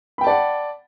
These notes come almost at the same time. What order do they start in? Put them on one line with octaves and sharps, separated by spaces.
B5 G5 A5 D5 F#5